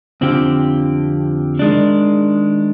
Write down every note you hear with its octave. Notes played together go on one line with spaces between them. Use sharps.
F2 D3 F3 C4 G4
D#3 G#3 D4